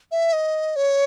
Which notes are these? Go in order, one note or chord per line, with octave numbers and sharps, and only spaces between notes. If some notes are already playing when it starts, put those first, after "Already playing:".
E5
D#5
C#5